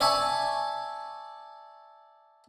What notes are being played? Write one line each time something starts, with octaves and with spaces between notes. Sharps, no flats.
D5 E5 G#5 A5 C#6